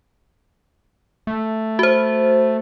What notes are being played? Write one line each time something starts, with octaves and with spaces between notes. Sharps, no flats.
A3
F#4 C5